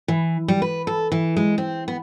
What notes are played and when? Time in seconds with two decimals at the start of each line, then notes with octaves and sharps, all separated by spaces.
0.08 E3
0.48 G3
0.62 B4
0.87 A4
1.12 E3
1.37 G#3
1.58 C4
1.88 B3